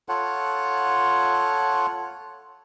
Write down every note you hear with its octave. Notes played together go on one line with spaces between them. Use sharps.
F4 A4 C#5 F#5